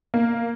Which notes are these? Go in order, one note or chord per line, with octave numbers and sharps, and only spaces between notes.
A#3